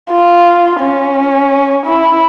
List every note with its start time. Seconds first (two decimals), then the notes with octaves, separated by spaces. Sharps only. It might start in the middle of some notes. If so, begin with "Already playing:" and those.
0.10 F4
0.80 C#4
1.86 E4